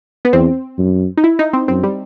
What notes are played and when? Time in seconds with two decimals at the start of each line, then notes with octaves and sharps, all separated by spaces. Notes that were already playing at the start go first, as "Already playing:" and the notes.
0.25 B3
0.33 E2 C4
0.79 F#2
1.17 D#4
1.24 E4
1.39 D#4
1.53 C4
1.68 F#2 C4
1.83 G3